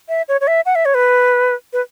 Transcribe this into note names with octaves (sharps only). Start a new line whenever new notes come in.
E5
C#5
C#5
E5
F#5
E5
C#5
B4
B4